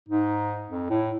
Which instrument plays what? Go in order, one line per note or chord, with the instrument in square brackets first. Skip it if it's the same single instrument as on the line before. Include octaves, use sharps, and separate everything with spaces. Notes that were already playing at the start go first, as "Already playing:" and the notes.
[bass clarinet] G#2 [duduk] D#4
[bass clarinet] F2
[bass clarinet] A2 [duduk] E4